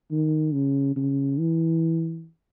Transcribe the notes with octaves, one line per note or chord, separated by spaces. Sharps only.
D#3
C#3
C#3
E3